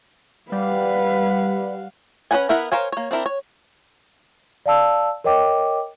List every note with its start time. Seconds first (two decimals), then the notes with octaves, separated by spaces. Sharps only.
0.52 G3 B4 F5 F#5
2.31 C#4 A#4 B4 F#5 G#5
2.49 B3 E4 A#4 E5 F#5
2.72 A#4 C5 C#5 F5 G#5
2.92 A#3 C#5
3.11 C4 D4 E4 A#4
3.26 C#5
4.66 D5 F5 A5 E6
5.24 A#4 C#5 D#5 G5 D6